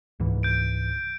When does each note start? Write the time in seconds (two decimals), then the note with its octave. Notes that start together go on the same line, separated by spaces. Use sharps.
0.20 C#2 G#2 E3
0.43 G6 D7